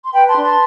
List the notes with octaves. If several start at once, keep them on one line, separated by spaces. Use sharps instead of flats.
C6
B4 G5 B5
A5 C6
D4
A5 C6